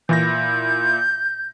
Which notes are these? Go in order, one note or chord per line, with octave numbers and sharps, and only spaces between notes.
A#2 E3 E4 G6 A#6